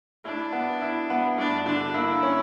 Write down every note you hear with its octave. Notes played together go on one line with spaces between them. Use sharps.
D4 E4
B3
E4
B3
G2 D4
D3 D4
A#3 E4
C#4